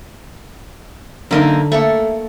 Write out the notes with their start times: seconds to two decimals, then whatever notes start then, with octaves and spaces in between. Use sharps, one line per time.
1.31 F#2 D3 A#3 D#4 B5
1.72 A3 A#3 A4 C#6